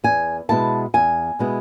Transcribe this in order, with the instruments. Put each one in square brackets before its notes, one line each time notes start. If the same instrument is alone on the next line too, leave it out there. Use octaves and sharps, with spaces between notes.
[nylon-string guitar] E2 G#5
B2 G#3 B3 E4 A5
E2 G#5
B2 G#3 B3 E4